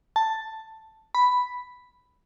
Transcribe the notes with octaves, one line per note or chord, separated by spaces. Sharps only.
A5
B5